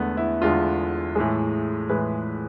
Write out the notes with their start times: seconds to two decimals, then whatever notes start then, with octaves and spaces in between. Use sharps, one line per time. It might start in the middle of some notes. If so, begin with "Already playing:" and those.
Already playing: E2 D3 G#3 A3 B3
0.17 E4
0.42 E2 D3 G#3 F4
1.15 A2 E3 G#3 G#4
1.89 A2 E3 G#3 B4